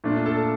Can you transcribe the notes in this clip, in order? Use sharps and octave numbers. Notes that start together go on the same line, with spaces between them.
A#2 A3 D4 F4
A4 A5